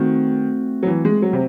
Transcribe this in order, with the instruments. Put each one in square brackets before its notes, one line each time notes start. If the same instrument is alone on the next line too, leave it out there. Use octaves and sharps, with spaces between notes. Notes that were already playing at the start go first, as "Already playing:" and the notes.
Already playing: [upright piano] D#3 [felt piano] A3 C4 F#4
[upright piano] F#3
E3
G#3
F#3
C3